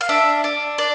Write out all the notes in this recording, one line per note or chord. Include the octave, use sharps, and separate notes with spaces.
F5
D4 E5
D4
D4 D5